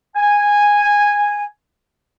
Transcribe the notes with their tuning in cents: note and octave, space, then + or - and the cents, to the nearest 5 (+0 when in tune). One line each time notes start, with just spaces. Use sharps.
G#5 -10